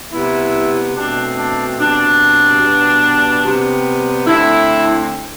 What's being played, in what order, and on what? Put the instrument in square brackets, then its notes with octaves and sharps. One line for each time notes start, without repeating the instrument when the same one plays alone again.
[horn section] C3 G3 B3 E4
B2 A3 C4 D4
D4
B2 G3 C4 D4
B2 G3 B3
C3 G3 B3
D3 A3 C4 E4